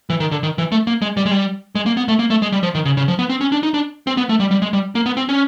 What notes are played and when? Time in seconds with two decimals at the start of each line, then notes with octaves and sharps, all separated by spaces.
0.10 E3
0.20 D#3
0.31 D3
0.43 D#3
0.58 E3
0.72 A3
0.87 A#3
1.02 G#3
1.17 G3
1.26 G#3
1.31 G3
1.75 G#3
1.86 A#3
1.97 B3
2.08 A3
2.19 A#3
2.30 A3
2.42 G#3
2.52 G3
2.63 F3
2.75 D#3
2.85 C#3
2.97 C#3
3.08 F3
3.19 B3
3.30 C4
3.41 C#4
3.52 D4
3.63 D#4
3.74 D4
4.07 C4
4.17 B3
4.29 A3
4.40 G3
4.51 G3
4.62 G#3
4.73 G3
4.95 A#3
5.06 B3
5.17 C4
5.29 C#4